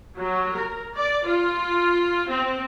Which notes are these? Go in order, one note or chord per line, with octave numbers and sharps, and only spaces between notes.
F#3
A#4
D5
F4
C4